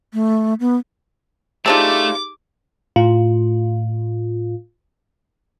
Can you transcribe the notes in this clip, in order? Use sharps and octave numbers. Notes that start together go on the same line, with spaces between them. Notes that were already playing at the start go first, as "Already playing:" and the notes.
A3
B3
A3 C4 D4 D#4 F4 G4 G#4 D6
A2 F4